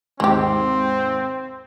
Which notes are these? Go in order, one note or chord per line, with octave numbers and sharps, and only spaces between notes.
D#2 G#2 C3 G#3 C4 G4